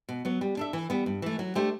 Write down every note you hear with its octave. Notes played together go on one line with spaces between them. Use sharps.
B2
F#3 B3
G3
D4 A4 E5
E3
G3 B3
G2
E3 A3
F#3
A3 D4 G4 C5